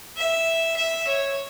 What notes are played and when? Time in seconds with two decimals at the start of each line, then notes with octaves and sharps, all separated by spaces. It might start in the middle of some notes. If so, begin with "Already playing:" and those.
0.16 E5
0.77 E5
1.07 C#5